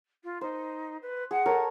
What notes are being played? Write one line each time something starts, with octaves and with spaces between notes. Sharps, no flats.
F4
D#4 C5
B4
G#4 F#5
A4 A#4 C#5